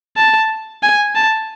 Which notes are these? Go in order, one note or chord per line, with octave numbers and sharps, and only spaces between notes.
A5
G#5
A5